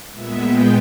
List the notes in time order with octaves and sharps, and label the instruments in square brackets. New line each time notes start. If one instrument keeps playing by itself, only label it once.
[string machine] A#2 G#3 B3 E5
G5